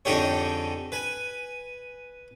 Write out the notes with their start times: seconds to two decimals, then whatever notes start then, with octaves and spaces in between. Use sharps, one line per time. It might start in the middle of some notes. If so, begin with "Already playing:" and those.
0.05 F2 D3 D#4 G4 G#4 C#5
0.92 B4 G#5